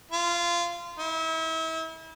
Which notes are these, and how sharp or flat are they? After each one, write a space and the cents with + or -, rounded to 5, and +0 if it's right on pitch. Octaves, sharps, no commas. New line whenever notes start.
F4 -20
E4 -35